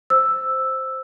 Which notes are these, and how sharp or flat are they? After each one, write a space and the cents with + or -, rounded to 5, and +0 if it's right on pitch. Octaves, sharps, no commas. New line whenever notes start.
C5 +0 E6 +0